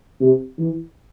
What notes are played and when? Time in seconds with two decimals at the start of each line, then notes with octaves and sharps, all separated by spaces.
0.20 C3
0.58 E3